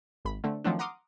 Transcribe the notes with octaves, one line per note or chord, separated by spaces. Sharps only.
G#1 B5
D3 A3 C4
D#3 F3 F#3 A3 C4 D4
F#5 A#5 C6 D6 D#6 F6